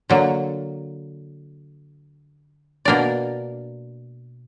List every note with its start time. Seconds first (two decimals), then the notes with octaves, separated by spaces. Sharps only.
0.10 D3 F#3 A#3
2.85 B2 A#3 D4 A#4 D5